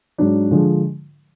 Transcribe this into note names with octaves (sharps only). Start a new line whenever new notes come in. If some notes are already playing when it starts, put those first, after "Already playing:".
G#2 F#3 D4
D3 F3 G#3